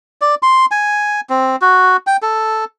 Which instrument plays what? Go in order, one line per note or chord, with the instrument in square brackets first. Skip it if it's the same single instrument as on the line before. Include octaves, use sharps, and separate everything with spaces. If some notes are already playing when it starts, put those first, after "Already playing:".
[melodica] D5
C6
G#5
C4
F#4
G5
A4